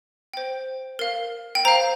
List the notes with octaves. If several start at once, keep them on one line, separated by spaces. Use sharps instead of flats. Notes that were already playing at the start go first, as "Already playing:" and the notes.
C5 G5
A#4 F5
G5
C5 F5 A#5